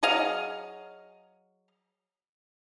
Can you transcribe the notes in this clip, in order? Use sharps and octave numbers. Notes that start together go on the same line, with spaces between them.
F#3 G#4 D#5 F5